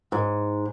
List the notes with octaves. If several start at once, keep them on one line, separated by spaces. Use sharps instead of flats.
G#2